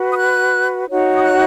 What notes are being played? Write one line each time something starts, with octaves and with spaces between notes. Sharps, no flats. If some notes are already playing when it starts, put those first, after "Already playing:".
Already playing: F#4 B4
D#6
F#6
D#4 F#4 C#5
D#6
F#6